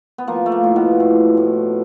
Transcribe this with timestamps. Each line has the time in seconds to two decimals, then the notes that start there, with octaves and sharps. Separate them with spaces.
0.18 B3
0.27 F3 A#3
0.46 A3
0.52 A#3
0.64 A2
0.76 B2 B3
1.00 A2
1.37 A2